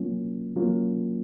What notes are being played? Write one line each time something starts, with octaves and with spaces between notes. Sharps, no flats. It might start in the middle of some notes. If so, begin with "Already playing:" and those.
Already playing: F#3 A#3 C#4 F4
F#3 A#3 C#4 F4